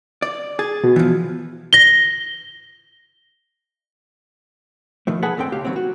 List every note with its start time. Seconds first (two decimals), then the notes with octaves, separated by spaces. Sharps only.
0.22 D5
0.59 G#4 A6
0.84 B2
0.96 E3 F3
1.73 A#6 G7
5.07 B2 D#3 F3 A3
5.22 G#4 A4 B4 F#5 G#5 A5
5.37 D2 G#2 C4 A4 C5 G5
5.52 C#2 G4 F5
5.65 D#3 E3 F#3 B3 C4
5.76 F#4